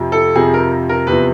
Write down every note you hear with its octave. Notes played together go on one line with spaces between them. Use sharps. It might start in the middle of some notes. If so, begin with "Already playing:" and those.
Already playing: F2 C3 F3
A4
F2 C3 F3 G#4
A#4
A#4
E2 C3 F3 B4